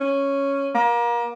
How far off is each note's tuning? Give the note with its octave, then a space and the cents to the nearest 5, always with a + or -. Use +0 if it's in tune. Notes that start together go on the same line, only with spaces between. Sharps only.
C#4 +0
A#3 +30